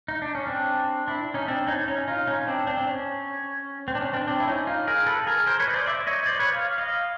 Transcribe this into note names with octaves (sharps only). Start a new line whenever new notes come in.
D#4
D4
C#4
C4 D4
D4 E4
C#4 D#4
C4 D4
C#4 D#4
C#4 D#4
D#4 F4
C#4 D#4
C4 D4
C4 D4
D4
C#4
C4
D4
C#4
C4 D4
C4 D4
E4
C#4 D#4
D#4 F4
G#4 A#4
A4 B4
G#4 A#4
A#4 C5
B4 C#5
D#5
C5 D5
D5 E5
C#5 D#5
C5 D5
B4 C#5
F5
D#5 F5